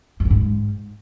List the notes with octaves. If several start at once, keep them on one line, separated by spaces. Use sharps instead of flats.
F2
E2
G#2